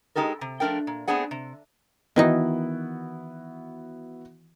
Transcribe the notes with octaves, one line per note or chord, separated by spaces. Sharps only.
G#3 A#3 D#4 G4 A4 A#4
C3
F3 A3 D4 A#4 G5
A#2
A3 B3 C4 D4 G#4 F#5
C3
D#3 E3 B3 D#4 E4 F#4